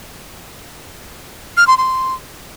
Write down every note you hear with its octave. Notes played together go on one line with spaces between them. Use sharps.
F6
C6
C6